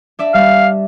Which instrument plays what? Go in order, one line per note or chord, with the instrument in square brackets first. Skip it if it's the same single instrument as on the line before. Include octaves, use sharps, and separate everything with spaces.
[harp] D4 D5 E5
[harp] G3 [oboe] F5